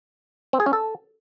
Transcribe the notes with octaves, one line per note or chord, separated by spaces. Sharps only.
C4
G#4
C#4
A4